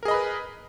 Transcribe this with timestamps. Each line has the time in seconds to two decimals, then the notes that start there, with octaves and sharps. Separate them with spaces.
0.03 A#4
0.05 G#4
0.08 D#5
0.11 B5
0.14 B4